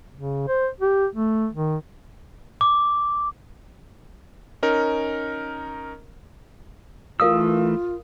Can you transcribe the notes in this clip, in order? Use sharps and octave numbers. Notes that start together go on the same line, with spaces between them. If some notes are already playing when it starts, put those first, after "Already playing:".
C#3
C5
G4
A3
D#3
D6
C#4 D#4 A#4
E3 A3 F4 A#4 F5 D#6 E6